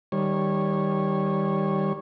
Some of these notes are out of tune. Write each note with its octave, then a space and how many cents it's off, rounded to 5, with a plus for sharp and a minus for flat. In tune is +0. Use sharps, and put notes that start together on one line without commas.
D#3 +10 G3 +0 C#5 -15